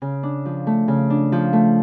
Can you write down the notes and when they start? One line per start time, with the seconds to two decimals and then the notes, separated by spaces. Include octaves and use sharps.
0.02 C#3
0.23 D4
0.45 F3
0.67 A3
0.88 C#3
1.10 D4
1.32 F3
1.53 A3